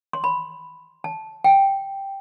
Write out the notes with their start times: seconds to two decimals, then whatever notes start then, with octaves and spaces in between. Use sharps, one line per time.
0.13 C6
0.24 B5
1.04 A5
1.44 G5